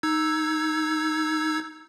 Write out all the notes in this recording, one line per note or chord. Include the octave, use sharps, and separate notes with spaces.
D#4 E6 G#6